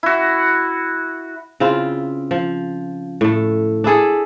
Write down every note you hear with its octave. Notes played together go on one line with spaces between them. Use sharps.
E4 F#4
C#3 C4 E4 F4
F3
A2 A3
D4 E4 G#4 A4